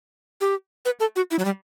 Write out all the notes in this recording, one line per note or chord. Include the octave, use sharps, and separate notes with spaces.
G4
B4
A4
F#4
E4
F#3
G3